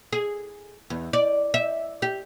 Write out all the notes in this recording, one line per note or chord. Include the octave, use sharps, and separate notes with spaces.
G#4
E2
D5
E5
G4